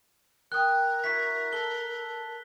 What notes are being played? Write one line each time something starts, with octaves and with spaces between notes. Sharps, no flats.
A#4 G5 D#6 F#6
E4 F#4 B6
A4 G7